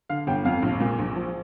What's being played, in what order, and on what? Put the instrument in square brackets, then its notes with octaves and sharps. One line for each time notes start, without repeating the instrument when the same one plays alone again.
[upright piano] D3 F5
G1 G5
F2 F5
A#1
A#2
A#1
F3